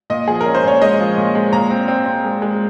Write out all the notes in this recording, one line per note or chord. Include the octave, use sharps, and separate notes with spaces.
A#2 D#5
F3 G#4
A#4
C#4
C5
A#2 C#5
G#3 D#5
F3
A#2
G#3
A#2 A#5
C4
C4
C4
G#3
G#3